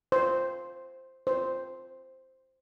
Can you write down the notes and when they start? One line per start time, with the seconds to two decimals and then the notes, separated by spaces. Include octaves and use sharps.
0.12 C5
1.27 C5